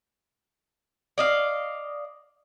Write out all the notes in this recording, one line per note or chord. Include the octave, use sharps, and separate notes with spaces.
D5 D#5 F5